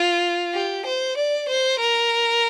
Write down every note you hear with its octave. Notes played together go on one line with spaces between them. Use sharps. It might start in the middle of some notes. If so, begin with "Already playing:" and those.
Already playing: F4
G4
C5
D5
C5
A#4